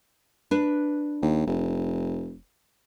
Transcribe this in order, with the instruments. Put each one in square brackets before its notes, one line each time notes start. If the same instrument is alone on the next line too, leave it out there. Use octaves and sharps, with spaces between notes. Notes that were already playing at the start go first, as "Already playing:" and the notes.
[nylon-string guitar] D4 B4
[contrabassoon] D#2
F1